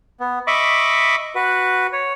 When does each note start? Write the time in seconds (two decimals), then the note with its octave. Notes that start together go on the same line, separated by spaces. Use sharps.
0.20 B3
0.47 D#5 E5 B5 C#6 D6
1.35 F#4 B4
1.93 C#5